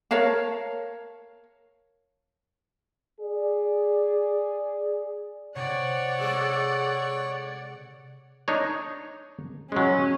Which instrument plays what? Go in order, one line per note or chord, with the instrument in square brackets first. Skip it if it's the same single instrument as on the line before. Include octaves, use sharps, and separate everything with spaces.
[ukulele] A#4 C#5 F5 A5
[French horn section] G#4 D5
[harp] C3 [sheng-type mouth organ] C#5 [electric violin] D5 F#5
[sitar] G#3 G#4 A4
[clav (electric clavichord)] D4 D#4 C#5
[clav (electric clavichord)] F#3 G#3 [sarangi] C#4